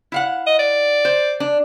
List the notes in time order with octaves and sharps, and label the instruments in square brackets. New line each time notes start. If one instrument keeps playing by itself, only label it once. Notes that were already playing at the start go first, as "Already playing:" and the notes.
[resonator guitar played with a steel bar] E4 F5 F#5
[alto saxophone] D#5
D5
[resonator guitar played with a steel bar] C5
D4